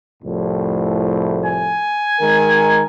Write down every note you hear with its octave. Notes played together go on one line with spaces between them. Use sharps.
C2 F2 A2
G#5
D#3 G#3 A#4